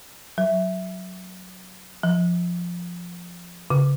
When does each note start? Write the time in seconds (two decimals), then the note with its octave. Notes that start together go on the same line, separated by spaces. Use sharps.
0.38 F#3
2.03 F3
3.70 C#3